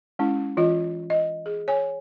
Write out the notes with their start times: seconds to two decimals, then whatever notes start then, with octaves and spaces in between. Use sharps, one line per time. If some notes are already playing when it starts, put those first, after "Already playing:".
0.19 G#3 C#4 E4
0.57 E3 F4 D#5
1.10 D#5
1.46 G#4
1.68 C#5 G#5